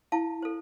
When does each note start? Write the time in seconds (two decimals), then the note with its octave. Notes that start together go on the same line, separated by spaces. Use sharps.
0.12 E4 F5 A5
0.42 A4 C5